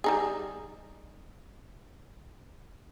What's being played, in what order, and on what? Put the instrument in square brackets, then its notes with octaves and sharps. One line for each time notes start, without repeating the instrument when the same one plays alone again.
[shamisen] G3 D#4 G#4